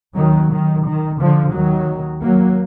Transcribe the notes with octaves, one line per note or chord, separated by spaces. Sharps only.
D#2 D#3 F#3
D#3
D#3
D3 F3
D#2 D#3 F#3
F#3 A#3